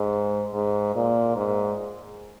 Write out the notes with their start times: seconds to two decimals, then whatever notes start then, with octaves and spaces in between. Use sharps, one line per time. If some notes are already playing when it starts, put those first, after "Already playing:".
Already playing: G#2
0.54 G#2
0.95 A#2
1.36 G#2